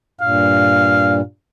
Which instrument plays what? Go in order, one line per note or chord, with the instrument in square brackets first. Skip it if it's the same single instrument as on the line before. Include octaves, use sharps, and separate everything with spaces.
[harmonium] G2 A#2 [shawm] F5